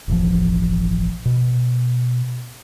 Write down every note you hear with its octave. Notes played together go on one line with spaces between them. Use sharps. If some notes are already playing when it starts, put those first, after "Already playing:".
E1 A1 E2 F3
B2